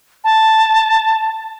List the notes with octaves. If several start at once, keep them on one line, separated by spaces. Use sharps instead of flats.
A5